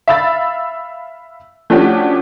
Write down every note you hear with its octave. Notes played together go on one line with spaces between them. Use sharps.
E5 F5 B5 E6 A6
F3 A3 C#4 D4 F#4 G4